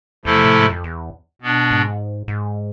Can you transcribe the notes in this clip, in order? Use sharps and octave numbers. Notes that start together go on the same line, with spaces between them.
E2 C3 F3 A3 E4 A4
A2
G#2
F2
E2
B2 B3 D4
G#2
G#2